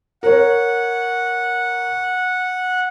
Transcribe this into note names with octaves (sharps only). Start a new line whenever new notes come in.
A#4 C#5 F#5